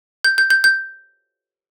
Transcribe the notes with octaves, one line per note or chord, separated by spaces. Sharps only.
G6
G6
G6
G6